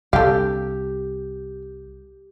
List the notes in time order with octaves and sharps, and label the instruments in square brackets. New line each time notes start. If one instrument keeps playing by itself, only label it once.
[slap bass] C2 [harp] G4 [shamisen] A4 F5